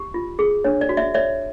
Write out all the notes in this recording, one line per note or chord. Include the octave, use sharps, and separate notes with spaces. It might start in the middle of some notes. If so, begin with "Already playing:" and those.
Already playing: G4
F4
G#4
D4 C#5
D5
F#4
D5 E5
C#5 D5 E5